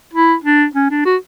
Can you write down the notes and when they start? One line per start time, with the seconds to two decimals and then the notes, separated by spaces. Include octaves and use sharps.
0.13 E4
0.44 D4
0.75 C#4
0.90 D4
1.06 F#4